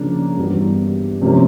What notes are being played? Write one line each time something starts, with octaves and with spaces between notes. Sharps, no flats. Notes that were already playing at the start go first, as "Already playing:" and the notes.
Already playing: C#3 F3 A#3 D4
G2 E3 G3 B3
C3 F3 A#3 C#4